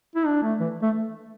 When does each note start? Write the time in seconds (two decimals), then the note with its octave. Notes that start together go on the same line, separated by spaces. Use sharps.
0.16 E4
0.26 D4
0.42 A3
0.60 E3
0.82 A3